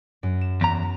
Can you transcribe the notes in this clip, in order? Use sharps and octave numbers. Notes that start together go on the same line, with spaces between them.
F#2
E7
E2 A#5